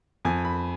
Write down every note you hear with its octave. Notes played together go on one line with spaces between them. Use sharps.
F2 G#5
B5